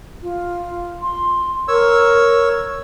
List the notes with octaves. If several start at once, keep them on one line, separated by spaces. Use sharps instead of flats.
F4
C6
A#4 C#5 E6